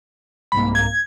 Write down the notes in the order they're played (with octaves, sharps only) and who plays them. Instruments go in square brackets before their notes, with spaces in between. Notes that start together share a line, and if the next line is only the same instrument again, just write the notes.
[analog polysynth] C2 G#2 A#3 [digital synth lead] B5
[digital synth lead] G#6